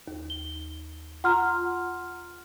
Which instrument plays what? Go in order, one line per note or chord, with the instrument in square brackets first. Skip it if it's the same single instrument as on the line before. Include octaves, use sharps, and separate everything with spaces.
[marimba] D#2
[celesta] G7
[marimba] F4 A#5 [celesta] F#5 C6 F6